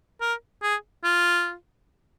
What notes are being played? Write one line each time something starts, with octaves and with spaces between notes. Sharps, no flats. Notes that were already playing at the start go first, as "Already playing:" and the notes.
A#4
G#4
F4